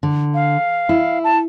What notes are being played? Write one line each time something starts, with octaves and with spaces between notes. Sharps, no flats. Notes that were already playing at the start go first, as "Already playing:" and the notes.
D3
F5
E4
A5